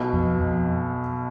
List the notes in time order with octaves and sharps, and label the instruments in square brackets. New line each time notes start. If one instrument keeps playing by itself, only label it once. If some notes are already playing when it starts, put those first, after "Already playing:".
Already playing: [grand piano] B1 B2
[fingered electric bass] F2
F2